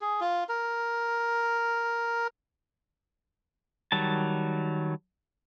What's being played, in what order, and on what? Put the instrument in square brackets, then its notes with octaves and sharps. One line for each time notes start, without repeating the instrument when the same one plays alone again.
[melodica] G#4
F4
A#4
[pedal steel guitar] D#3 F#3 G3 A5